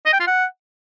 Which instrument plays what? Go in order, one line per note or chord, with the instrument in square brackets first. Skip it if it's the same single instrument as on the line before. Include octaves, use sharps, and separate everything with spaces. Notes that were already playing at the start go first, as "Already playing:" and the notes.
[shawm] D#5
G5
F4
F#5